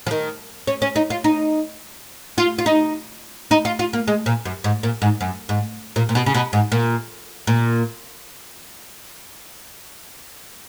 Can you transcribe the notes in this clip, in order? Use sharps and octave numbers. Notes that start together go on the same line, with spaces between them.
F3
D#3
C#4
C#4
D#4
F4
D#4
F4
F4
D#4
D#4
F4
F4
A#3
G#3
A#2
F#2
G#2
A#2
G#2
F#2
G#2
A#2
A#2
B2
C#3
B2
G#2
A#2
A#2